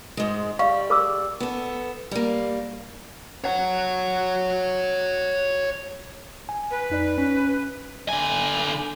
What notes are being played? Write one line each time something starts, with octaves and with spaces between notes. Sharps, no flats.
G#2 G#3
G3 F5 C#6
A#4 D6 E6
B3 A4
G3 A#3
C#5 F#5
G#5
B4
F2 D#4 D5
C#4
D3 G#5